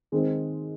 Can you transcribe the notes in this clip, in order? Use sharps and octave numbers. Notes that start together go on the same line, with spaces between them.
D#3 G#3 C4